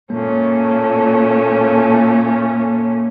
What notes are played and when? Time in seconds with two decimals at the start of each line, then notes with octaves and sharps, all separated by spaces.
0.10 A#2 A3 A#3 C#4
1.50 A#3